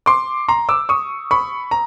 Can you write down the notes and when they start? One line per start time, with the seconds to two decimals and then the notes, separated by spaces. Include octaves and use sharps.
0.06 C6 D6
0.48 A#5 C6
0.69 D6 E6
0.89 C#6 D#6
1.31 B5 C#6
1.71 A#5